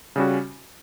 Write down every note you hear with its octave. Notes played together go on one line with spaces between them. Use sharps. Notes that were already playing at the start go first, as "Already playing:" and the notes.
C#3 G3 C#4 F#4